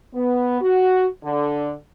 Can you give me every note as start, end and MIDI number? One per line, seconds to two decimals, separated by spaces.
0.14 0.58 59
0.61 1.05 66
1.22 1.73 50